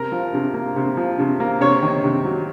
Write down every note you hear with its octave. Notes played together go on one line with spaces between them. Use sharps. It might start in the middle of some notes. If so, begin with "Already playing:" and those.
Already playing: C3 A#4
F3
C3
A#3
C3
F3
C3
A#3
C3 C#5
D#3
C3
F#3